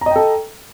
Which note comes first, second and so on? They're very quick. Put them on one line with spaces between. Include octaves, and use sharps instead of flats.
A#5 D#5 G5 A4